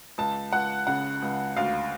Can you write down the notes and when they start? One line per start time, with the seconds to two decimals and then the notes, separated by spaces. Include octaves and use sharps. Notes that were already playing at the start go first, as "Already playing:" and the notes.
0.18 C#2 A5
0.53 C#2 F#5
0.87 C#3 F#5
1.22 C#2
1.57 D2 F5